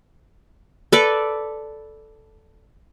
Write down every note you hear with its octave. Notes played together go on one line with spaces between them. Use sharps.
A4 B4 D5